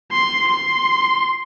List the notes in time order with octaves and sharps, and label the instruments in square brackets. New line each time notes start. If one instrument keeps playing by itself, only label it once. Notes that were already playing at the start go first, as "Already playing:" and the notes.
[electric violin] C6
C6